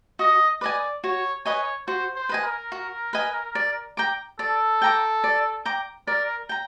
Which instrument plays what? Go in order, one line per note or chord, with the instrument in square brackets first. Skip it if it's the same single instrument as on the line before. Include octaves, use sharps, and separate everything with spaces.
[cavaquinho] F#4 [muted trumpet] D#5
[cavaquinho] B4 D#5 G#5 [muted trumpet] D5
[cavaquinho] F#4 [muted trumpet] C#5
[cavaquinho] B4 D#5 G#5 [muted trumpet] C#5
[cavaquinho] F#4 [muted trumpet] C5
[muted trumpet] C5
[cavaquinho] B4 D#5 G#5
[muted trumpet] A#4
[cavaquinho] F#4
B4 D#5 G#5
D5
G5 A#5 D6
[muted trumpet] A4 [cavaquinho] D5
[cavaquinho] G5 A#5 D6
D5
G5 A#5 D6
[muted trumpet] A#4 [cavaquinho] D5
[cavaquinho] G5 A#5